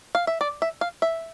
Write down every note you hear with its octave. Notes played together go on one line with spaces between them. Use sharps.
F5
E5
D5
E5
F5
E5